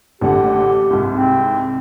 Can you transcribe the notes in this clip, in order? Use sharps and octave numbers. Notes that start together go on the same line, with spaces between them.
A1 D3 G4 F#5
C2 G#2
C4